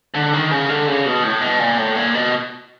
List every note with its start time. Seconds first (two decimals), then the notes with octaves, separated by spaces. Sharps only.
0.14 D3
0.33 D#3
0.51 C#3
0.69 D3
0.87 C#3
1.06 B2
1.23 A2
1.41 B2
1.59 A#2
1.78 A2
1.96 A#2
2.15 B2